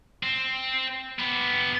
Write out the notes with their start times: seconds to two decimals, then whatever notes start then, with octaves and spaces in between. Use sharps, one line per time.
0.23 C4
1.19 B3 G4